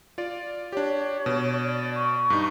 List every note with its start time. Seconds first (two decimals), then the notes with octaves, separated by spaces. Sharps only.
0.18 F4 D5
0.73 D4 G4 C#5
1.26 B2
1.65 D5
1.95 C#6
2.30 G2 D#4